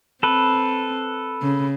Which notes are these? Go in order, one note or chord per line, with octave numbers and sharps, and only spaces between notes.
C4 A4 B4
C#3